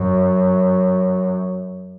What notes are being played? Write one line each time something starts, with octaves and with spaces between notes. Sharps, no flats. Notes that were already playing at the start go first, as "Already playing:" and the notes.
Already playing: F#2